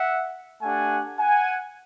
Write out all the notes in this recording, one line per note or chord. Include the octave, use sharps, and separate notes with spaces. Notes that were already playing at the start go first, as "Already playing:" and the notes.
Already playing: E5 F#5
A3 D4 G4 F#5 G#5
F#5 G#5